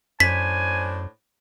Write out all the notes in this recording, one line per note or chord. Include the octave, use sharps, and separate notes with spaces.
F#2 A2 D4 C5 G#5 B6